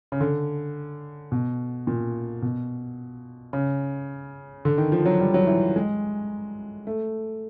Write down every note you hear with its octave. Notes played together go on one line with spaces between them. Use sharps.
C#3
D3
B2
A#2
B2
C#3
D3
D#3
F3
F#3
G3
F#3
E3
G#3
A3